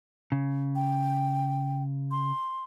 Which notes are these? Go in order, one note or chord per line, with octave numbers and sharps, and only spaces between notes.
C#3
G5
C6